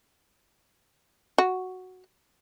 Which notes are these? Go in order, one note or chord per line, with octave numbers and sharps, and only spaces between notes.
F#4